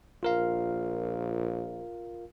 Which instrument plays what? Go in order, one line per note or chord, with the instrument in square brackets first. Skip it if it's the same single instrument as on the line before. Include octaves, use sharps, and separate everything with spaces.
[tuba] A#1 [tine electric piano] F4 A#4 F5